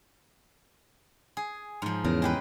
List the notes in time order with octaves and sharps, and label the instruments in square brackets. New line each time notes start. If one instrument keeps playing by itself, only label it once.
[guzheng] G#4
G#2 F3
[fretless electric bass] E2 [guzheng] C#3 A#4
[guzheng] G#3 G4 B4